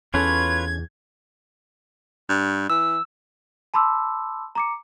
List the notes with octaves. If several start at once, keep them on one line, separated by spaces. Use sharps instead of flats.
E2 C#4 F4 A4 B4 C#5 G#6
G2
E3 E6
A5 B5 C6 D6 E6
A#5 D6 C#7